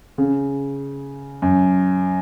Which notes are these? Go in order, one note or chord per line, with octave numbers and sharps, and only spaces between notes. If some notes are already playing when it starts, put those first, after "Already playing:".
C#3
F#2